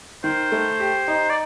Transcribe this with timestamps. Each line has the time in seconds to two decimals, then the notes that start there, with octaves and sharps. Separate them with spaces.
0.24 D#3 C5
0.52 A3
0.80 G4
1.08 D#4
1.30 D5